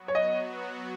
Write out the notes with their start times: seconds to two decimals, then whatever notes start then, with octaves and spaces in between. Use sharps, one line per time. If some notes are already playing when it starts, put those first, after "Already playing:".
Already playing: F#3 B3 F#4
0.08 C#5
0.15 D#5